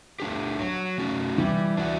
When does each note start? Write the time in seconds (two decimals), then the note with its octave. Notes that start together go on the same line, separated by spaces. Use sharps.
0.20 A3 D4 G4
0.60 F#3
0.98 A3 C#4 F#4
1.38 E3 G3
1.77 D4 F#4